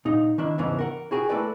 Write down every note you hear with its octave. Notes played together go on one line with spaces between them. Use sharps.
A#2 D#4
D#3 D4 E4
E2 G#2 C#3 E3 B3 D4
A#4 F#5
E4 F#4 G#4 G5 G#5
A3 A#3 E4 A4 B4 D5